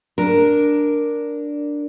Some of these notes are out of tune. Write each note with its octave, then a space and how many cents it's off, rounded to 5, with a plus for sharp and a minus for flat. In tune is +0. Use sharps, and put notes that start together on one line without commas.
D4 +0 A#4 +0